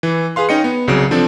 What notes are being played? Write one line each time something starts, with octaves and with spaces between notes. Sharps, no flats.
E3
G#4 B4 F5 C6
C#4 D#4 D#5 G5 C#7
B3
C2 C#3 F#3 D7
F3 C4 D4 A4